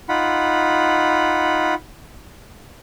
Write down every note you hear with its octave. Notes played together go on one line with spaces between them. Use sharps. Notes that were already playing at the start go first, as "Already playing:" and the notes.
D#4 F4 F#5 B5